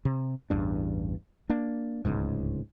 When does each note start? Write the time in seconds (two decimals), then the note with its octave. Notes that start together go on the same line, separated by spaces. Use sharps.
0.05 C3
0.50 A1 E2 G2 D4
1.49 A#3 D4
2.05 D1 G#1 C#2 G#2